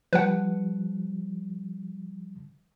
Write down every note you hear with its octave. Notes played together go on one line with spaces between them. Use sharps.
F3 G3 B4 F#5